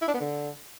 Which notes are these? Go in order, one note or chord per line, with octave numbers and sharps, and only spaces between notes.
E4
D4
B3
D3